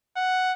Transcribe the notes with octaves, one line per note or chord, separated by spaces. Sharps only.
F#5